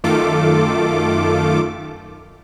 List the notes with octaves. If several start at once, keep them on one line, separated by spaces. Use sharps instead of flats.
F#2 D#3 A3 F4 A4 D6